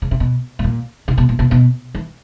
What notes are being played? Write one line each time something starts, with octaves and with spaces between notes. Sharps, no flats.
C#3
C3
B2
A2
A#2
C3
B2
A#2
B2
B2
E3